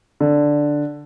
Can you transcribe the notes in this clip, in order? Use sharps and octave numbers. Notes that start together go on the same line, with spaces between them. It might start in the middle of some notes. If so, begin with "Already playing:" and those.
D3